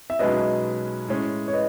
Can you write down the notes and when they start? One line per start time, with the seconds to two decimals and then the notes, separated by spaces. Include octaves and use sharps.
0.10 E5
0.19 B1 B2 G#3 C#4 E4 B4 D#5
1.08 A2 G#3 C#4
1.48 C#5
1.53 B4 D#5